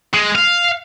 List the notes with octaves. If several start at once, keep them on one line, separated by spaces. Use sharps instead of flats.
G#3
F5